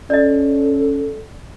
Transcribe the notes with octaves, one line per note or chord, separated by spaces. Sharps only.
C#4 A4 D5 D#5